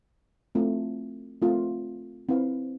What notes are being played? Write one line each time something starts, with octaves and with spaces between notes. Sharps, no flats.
A3 C4 F4
A3 C4 F4
C4 E4 B4 F5